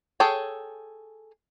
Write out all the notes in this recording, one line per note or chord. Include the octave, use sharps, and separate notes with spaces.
G#4 A4 C#5 G5